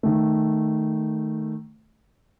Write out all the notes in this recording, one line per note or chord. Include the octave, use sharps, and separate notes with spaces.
D#3 A3